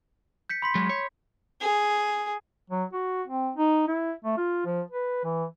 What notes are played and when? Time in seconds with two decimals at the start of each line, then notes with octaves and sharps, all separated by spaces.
0.50 G6 B6 C#7
0.62 B5 C6 B6
0.75 F#3 G#3
0.89 C#5
1.61 G#4
2.70 F#3
2.93 F#4
3.27 C4
3.56 D#4
3.88 E4
4.24 A3
4.37 F4
4.66 F3
4.91 B4
5.24 E3